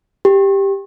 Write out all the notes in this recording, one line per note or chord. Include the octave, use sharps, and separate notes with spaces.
G4